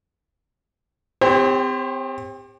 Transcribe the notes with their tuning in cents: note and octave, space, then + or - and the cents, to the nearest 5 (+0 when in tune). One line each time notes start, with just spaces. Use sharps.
C4 -25 G4 +30 C5 +45